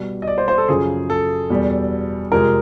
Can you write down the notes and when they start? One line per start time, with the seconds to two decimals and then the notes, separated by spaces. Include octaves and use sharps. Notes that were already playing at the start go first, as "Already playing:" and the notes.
Already playing: B2 G3
0.22 D#5
0.28 D5
0.38 C5
0.48 C5
0.58 A4
0.68 F#2 C#3 F3 G#4
1.10 A4
1.50 E2 B2 G3
2.31 F2 C3 F3 G#3 A#4